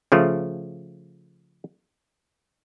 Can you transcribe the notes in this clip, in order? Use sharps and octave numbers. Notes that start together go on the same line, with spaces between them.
C#3 F3 A3